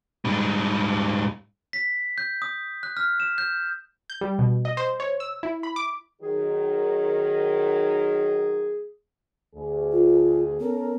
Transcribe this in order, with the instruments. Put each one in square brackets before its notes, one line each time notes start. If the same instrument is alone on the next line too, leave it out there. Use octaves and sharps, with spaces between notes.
[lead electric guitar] G#2 G3
[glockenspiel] B6
G6
D#6
F#6
F6
E7
G6
[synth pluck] G6
G3
B2
D#5
C5
C#5
E6
E4
B5
D6
[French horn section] D#3 F#3 [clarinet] G#4
[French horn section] D2 G#4
[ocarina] F4
[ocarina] B3 [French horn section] C#4 A4 A#4